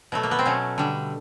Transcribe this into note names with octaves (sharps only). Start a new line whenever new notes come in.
B2 F#3 A3
A#3
B3
C4
B2 F#3 A3 C#4
D3 G3